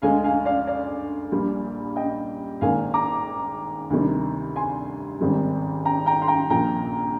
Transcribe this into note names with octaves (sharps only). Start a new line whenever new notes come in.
D2 D3 G#3 F5 G#5
F5 G#5
D5 F5
D5 F5
A#1 A#2 G3 A#3
D#5 G5
G#1 G#2 D#3 A#3 F5 G#5
A#5 D6
D2 C3 D#3 G3 C4
G#5 C6
G#1 G#2 D#3 G3 C4
G5 A#5
G5 A#5
C6
G5 A#5
A#1 A#2 F3 A#3 G5 A#5